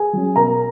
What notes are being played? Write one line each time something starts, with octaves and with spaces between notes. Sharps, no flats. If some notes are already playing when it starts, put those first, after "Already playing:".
Already playing: G#4 G#5
F#3 C#4
B2 A#4 A#5